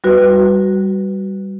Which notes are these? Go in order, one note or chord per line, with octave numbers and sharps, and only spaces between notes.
G3 F#4 B4